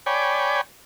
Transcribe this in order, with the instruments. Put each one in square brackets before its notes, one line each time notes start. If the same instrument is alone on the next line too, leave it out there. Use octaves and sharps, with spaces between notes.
[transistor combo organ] C#5 D5 G5 G#5 B5